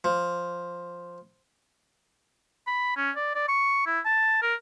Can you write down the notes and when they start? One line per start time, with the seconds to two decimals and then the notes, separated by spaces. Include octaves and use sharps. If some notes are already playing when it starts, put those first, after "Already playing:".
0.04 F3
2.67 B5
2.97 C#4
3.16 D5
3.35 D5
3.48 C#6
3.86 E4
4.05 A5
4.42 A#4